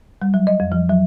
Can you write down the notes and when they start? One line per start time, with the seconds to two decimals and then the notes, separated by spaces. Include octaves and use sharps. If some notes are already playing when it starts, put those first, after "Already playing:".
0.22 G3
0.34 F#3
0.47 D#5
0.60 F2
0.72 F3
0.90 F#3